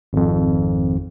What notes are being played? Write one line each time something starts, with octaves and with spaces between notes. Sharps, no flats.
G#1 F2